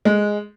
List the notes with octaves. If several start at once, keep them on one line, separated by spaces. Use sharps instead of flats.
G#3